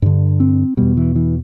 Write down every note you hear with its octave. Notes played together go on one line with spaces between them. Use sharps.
G2 D3
C4
E2 B2 G3
E3
E3